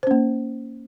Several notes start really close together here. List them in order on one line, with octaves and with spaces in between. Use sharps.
C5 C#4 A#3